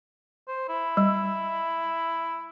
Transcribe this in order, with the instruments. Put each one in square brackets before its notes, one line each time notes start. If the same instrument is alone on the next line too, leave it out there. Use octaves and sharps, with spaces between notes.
[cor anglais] C5
E4
[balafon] G3